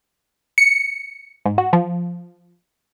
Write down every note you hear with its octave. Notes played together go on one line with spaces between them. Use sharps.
C#7
G#2
F#4
F3